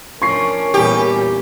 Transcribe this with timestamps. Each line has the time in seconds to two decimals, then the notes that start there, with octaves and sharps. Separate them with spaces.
0.22 F3 C#4 D4 A#4 C#6 C7
0.74 E2 A#2 G3 G4